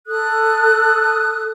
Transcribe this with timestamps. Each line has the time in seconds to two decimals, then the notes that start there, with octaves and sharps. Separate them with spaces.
0.07 A4 D#6 F#6